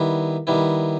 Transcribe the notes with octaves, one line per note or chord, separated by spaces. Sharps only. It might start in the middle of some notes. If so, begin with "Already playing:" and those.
Already playing: D#3 G3 B3 E4
D#3 G3 B3 E4